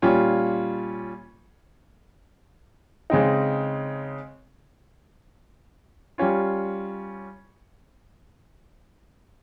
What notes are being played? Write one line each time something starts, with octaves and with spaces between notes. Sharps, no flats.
A#2 G3 C#4 F4
C#3 G#3 C4 D#4
G3 C#4 F4